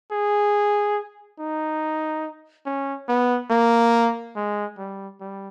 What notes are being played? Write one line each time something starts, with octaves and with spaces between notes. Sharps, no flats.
G#4
D#4
C#4
B3
A#3
G#3
G3
G3